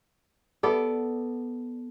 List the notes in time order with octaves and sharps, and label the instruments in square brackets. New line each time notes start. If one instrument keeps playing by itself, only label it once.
[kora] B3 A4 D5